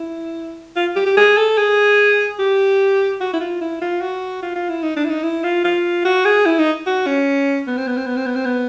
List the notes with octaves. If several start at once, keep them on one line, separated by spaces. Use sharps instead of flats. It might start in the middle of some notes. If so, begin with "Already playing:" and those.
Already playing: E4
F4
G4
G4
G#4
A4
G#4
G4
F#4
E4
F4
E4
F4
F#4
F4
F4
E4
D#4
D4
E4
D#4
E4
F4
F4
F#4
G#4
E4
D#4
F#4
C#4
B3
C4
B3
C4
B3
C4
B3
C4
B3